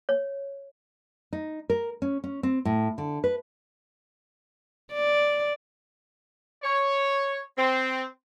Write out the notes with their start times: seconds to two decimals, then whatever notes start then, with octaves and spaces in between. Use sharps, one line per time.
0.09 C#5
1.33 D#4
1.70 A#4
2.02 C#4
2.24 C#4
2.43 C4
2.65 A2
2.98 D3
3.24 B4
4.93 D5
6.63 C#5
7.57 C4